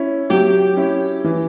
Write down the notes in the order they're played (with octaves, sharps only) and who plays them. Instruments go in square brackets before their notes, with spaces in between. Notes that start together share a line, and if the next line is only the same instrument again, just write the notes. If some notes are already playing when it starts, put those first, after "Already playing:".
Already playing: [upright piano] C#4 E4
[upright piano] F#3 [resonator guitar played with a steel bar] G4
[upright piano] C#4 E4
E3